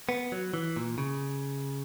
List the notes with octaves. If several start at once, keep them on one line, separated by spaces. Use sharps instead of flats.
B3
F#3
E3
A#2
C#3